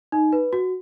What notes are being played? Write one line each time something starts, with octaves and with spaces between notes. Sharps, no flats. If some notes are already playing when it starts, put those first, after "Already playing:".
D#4
B4
F#4